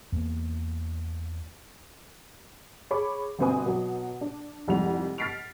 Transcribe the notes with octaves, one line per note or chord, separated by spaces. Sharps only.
E2 A#3
G#4 C#5 B5 D6
G1 B2 C4 B4 G#5 D#6
B2 F#3
D4
C2 F2 G#2 G3 F#5 F7
F6 A6 B6 C7 D7 F7